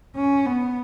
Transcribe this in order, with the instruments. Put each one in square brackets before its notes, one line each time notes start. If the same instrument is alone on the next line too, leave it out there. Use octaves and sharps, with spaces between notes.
[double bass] C#4
B3